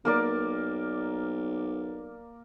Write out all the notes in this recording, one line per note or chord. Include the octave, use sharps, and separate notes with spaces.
B1 A#3 A#4 D5